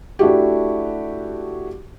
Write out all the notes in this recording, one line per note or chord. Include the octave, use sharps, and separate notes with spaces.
A3 D4 E4 F#4 G4